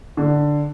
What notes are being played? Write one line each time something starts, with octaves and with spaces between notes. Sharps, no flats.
D3